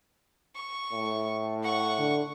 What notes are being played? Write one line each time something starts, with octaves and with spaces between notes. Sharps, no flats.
C#6
A2
F#5 C#6
D3